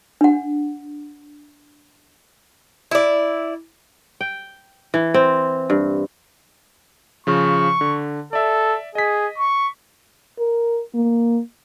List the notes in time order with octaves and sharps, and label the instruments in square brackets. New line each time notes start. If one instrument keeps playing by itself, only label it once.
[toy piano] D4 F#5
[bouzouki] E4 D5
[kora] G5
E3
C4
G2
[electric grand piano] C#3 F3 [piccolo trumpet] C#6
[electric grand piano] D3
[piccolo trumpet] A4 [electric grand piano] D5 E5
[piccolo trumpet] G#4 [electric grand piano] D#5 B6
[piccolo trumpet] C#6
[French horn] A#4
A#3